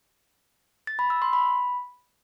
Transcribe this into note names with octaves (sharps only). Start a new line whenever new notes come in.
A6
B5
E6
C6
B5